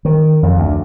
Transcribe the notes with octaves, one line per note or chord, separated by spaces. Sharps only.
D#3
F2
D2